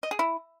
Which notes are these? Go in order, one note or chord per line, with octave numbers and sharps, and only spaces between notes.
D#5
G#4
E4